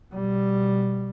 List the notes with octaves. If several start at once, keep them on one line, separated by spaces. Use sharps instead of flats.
B2 G3